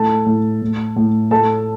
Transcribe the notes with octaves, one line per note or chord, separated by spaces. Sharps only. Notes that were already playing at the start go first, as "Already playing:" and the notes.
Already playing: A2 A4 A5
A2
A2
A2
A2 A4 A5